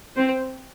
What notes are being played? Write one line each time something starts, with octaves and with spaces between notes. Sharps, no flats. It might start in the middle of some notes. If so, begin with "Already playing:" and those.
C4 C5